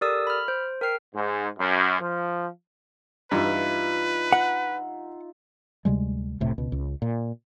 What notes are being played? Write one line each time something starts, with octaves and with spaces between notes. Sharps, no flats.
G4 A4 A#4 D5 D#6 E6
B5 F6
C5
A#4 G5 F6 C7
G#2
F#2
F3
G2 E3 D#4 F4 B4 E5
F#5
D2 C3 G3 G#3
F1 A2 C3
C#2 B2
C#2
A#2